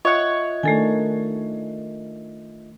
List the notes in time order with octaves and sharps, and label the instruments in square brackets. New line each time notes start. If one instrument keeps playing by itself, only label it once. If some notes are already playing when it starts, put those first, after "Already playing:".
[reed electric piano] F4 D#5 E5 [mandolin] C#5 F#5
[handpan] D#3 D4 [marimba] A3 A4 G#5